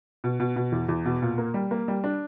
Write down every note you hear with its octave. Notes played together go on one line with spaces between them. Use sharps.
B2
B2
B2
E2
E2
B2
A#2
A#3
G3
A#3
G3
D4